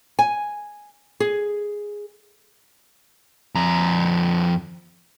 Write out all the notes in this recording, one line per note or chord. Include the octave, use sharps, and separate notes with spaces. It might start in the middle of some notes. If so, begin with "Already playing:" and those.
G#5
G#4
F2 A#5